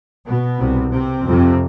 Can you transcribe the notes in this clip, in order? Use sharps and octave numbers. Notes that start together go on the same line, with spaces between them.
B2 B3
C2 C3
C3 C4
F2 C3